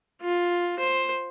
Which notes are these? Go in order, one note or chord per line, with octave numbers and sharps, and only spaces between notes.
F4
C5